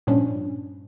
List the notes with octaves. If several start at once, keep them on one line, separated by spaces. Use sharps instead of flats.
G2 A#2 F3 C#4 D4